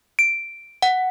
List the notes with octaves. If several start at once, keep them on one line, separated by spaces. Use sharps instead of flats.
D7
F#5